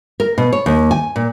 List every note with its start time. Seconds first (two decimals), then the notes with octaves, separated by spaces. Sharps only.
0.20 A#4
0.38 B2
0.53 C#5
0.66 D#2
0.91 G#5
1.16 A#2